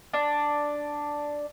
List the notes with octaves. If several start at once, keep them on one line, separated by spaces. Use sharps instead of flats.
D4